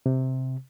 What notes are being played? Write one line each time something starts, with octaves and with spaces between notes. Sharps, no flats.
C3